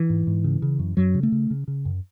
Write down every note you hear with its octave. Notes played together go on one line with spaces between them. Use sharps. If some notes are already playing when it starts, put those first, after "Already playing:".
Already playing: E3
G#2
G#2
C#3
C#3
F#2
F#2 F#3
C#3
A3
C#3
C#3
C#3
F#2